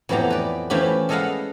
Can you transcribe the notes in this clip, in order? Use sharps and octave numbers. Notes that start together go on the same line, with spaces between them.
F2 A2 E3 B3 G4 A#5
B4 D5
E3 F3 A3 C#4 G4 B5
G#3 A4 D#5 F5 F#5 B5